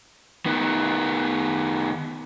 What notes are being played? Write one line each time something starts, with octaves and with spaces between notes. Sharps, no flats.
D#3 B3